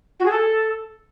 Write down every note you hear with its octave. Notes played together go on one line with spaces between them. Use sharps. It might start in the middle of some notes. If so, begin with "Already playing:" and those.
F#4
G#4
A4